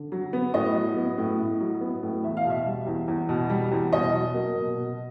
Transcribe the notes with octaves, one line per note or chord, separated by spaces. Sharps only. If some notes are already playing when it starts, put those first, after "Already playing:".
Already playing: D3
F#3
B3
A2 D#5
F#3
B3
A2
A2
F#3
B3
A2
E2 E5
F5
B2
E5
G3
E2
E2
B2
G3
E2
B2 D#5
F#3
A#3
B2
B2